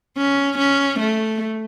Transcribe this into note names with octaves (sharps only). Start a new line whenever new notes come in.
C#4
C#4
A3